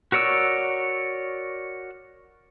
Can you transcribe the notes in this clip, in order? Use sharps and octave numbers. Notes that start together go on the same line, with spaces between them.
F#4 A#4 C#5 D5 E6